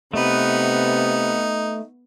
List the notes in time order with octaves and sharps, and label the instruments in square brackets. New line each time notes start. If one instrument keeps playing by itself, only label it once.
[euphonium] C3 [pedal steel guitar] A3 B4 [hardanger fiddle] B3 [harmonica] D#4